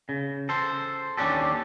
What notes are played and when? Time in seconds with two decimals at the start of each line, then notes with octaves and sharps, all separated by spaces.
0.09 C#3
0.49 A4 C5
1.18 D#2 C#4 D4 G4 A4